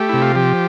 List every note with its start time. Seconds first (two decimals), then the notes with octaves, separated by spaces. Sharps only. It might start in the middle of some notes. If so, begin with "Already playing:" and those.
Already playing: A3 G4
0.09 C3 E4
0.22 F4
0.35 F3 G4